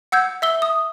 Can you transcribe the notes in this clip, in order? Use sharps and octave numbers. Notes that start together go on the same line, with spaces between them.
F#5 E6 G6 G#6
E5 E6 G7
D#6